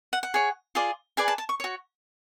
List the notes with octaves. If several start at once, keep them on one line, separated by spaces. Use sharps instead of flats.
F#5
F#5
G#4 C#5
F4 G#4 D5
G#4 B4 D5 G#5
A5
A5
C#6
F#4 C#5